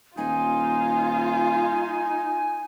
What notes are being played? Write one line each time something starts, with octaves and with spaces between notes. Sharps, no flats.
D#1 D#4 F4 G#5